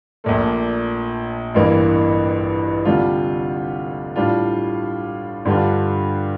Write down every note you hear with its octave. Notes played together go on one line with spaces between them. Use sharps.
A#1 A#2 A3
A1 G2 E3 A#3
D2 C3 G3 D4 F4
A2 G3 D4 F4
G2 D3 G3 D4 F4